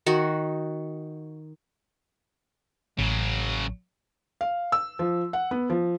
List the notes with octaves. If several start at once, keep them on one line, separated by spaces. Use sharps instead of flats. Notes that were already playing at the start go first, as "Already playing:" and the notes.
D#3 F#4
A1 C#3 F#3
F5
E6
F3
F#5
B3
F3